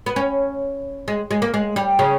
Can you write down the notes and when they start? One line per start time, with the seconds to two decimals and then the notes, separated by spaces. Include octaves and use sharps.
0.06 B3
0.16 C#4
1.08 G#3
1.31 G#3
1.42 A#3
1.54 G#3
1.76 G3
1.99 C#3